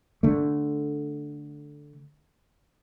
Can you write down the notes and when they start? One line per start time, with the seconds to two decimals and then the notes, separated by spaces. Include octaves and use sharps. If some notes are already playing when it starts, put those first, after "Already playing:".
0.23 D3 A3